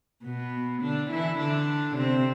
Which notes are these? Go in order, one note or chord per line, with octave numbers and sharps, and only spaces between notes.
B2 B3
D3 D4
E3 E4
D3 D4
C3 C4